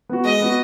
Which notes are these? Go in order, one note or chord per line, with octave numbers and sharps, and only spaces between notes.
B3 F#4
G#3 D#5
B3 F#4